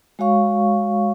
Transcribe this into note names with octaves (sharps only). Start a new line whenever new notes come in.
G#3 F#4 C#5 F5 C#6